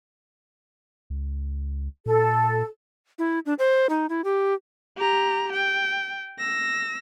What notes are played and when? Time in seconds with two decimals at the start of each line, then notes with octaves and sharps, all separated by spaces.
1.10 C#2
2.06 A#2 A4
3.19 E4
3.46 D4
3.59 C5
3.89 D#4
4.09 E4
4.24 G4
4.97 G4 A#5
5.53 G5
6.38 E6 A#6